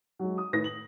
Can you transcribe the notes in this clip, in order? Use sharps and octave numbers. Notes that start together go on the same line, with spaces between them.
F#3 G#3
D#6
A2 D#3 B4 D#6 A#6
F#7